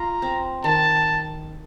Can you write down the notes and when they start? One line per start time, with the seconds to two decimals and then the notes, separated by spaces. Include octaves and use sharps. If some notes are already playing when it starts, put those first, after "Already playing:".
Already playing: F4 A#5
0.22 C4
0.64 D#3 A5